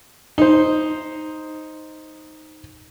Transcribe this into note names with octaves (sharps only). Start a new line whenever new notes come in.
D#4 C5